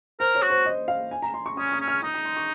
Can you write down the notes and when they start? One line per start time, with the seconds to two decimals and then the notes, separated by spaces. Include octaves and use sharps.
0.20 A#4 C5
0.35 C#5
0.42 F#4
0.50 C5
0.65 D#5
0.88 F5
1.11 G#5
1.22 A#5
1.34 C6
1.46 C#6
1.57 C#4 D#6
1.72 D#6
1.80 C#4
1.88 F6
2.03 D#4 D#6
2.14 D#6
2.25 C6
2.37 C#6